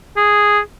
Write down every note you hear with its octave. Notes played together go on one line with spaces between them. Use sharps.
G#4